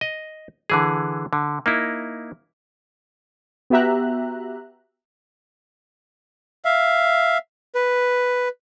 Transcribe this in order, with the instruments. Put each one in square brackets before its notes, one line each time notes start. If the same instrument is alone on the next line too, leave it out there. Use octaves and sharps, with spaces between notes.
[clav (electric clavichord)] D#5
D3 E3 G#4
D3
A#3 D#4 E4
[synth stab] B3 F#4 G4 E5 A#5 F#6
[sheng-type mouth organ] E5 F5
B4